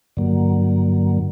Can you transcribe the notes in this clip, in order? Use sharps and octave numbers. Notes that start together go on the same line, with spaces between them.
G2 D3 F#3 A#3